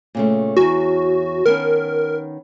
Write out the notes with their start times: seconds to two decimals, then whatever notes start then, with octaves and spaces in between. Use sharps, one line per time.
0.15 A#2 C#3 A3
0.57 E2 F#4 C#5
1.46 D#3 B3 C#4 A#4